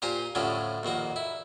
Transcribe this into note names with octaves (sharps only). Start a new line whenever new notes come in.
A#2 G4 C5 G#5 A#5
A2 D3 F3 F#3 C#4 D5
A#1 D#2 A#3 F#4
E4